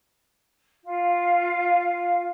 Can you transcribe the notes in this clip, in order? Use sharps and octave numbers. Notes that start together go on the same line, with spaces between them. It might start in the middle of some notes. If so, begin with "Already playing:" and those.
F4 F5